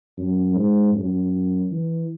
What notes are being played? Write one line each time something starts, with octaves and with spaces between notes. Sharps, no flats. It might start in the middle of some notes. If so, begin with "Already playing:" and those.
F#2
G#2
F#2
E3